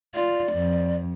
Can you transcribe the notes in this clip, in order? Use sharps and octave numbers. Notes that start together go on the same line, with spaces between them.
F4 D5
F2